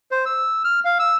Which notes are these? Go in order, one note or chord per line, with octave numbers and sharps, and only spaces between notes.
C5
E6
F6
F5
E6